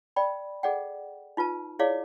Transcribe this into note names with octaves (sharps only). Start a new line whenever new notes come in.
D5 G5 B5
G#4 A4 D5 F#5 G5
D#4 F4 B4 A5
E4 G#4 C#5 D5 F5 D6